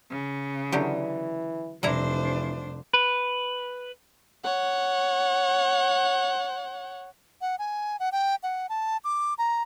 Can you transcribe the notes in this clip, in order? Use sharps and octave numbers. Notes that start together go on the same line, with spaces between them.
C#3
D3 E3 F#3 G4
F1 E3 G3 D4 E4 C5 A#5
B4
C#5 F#5
F#5
G#5
F#5
G5
F#5
A5
D6
A#5